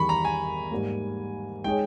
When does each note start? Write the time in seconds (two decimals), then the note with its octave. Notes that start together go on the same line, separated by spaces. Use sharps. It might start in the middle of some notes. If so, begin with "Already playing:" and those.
Already playing: E2 D#3 G3 B5 C#6
0.09 A#5
0.25 G#5
0.71 G#2 G3 A#3
1.64 G#3 D#4 G#4 C#5 G5